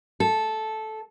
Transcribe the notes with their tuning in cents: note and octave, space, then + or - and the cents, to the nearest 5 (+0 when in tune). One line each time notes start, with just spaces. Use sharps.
A4 -10